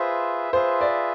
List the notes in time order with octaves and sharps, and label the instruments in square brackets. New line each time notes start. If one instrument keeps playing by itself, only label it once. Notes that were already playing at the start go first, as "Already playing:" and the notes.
Already playing: [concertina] F4 G#4 B4 E5 [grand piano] C5
[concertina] F4 G#4 B4 E5 [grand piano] C5
[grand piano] D5